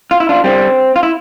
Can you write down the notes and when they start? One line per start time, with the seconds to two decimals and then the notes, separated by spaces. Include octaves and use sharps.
0.11 F4
0.20 E4
0.29 D4 F4
0.44 D3 G3 C4
0.96 F4
1.03 E4